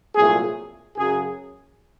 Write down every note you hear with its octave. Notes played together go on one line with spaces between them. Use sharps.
C2 A#2 F#3 A3 G#4
F#2 C#3 F#3 G#4